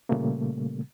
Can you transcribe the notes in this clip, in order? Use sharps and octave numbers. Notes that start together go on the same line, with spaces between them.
A#2 C#3 G3 A3 A#3